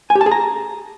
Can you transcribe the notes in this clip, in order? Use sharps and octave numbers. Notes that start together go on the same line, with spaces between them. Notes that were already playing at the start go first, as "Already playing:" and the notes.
G#5
G4
A5
G#4
A#5